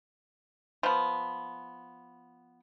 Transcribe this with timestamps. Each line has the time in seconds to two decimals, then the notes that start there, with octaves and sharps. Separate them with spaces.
0.83 F3 B3